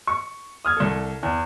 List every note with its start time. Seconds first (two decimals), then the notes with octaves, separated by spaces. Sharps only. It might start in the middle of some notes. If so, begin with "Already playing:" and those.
0.07 C#6
0.65 D#6 F6 G#6
0.77 C2 A4
1.23 E2